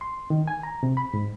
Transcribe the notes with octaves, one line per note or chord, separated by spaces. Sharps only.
C6
D#3
G#5
A#5
C3
B5
G#2